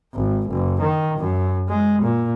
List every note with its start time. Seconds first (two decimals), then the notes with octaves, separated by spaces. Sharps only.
0.15 G#1
0.49 F#1
0.81 D#3
1.18 F#2
1.68 G#3
2.02 A#2